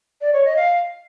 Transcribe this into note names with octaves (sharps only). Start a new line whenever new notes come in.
D5
C#5
D#5
F5